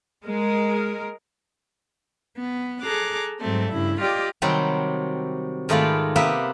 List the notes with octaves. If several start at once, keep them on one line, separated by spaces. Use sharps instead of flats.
G#3 A#4
B3
G#4 A4 A#5 D6 F#6
G#2 F#3 G3 A3 C4
G2 C#3 E4
F4 G4 D5 D#5 G5
C3 D#3 F#3 G3 C4
G#2 D#3 A3 F4 D5 B5
C3 A#3 B3 G4 B4 E5